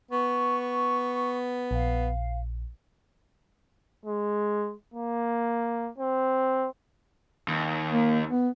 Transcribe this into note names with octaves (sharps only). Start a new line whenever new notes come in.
B3 C#6
A#1 F5
G#3
A#3
C4
D#2
A#3
B3